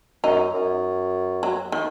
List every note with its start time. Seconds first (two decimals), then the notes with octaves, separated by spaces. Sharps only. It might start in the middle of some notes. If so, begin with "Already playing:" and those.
0.23 F#2 D#4
0.54 F#2
1.43 F#3
1.72 D#3